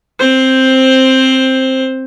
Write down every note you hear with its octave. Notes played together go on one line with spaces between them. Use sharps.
C4 C5